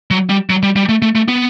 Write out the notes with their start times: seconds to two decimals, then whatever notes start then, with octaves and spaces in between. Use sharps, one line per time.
0.11 F#3
0.29 G3
0.50 F#3
0.63 G3
0.76 G3
0.89 A3
1.02 A3
1.15 A3
1.28 B3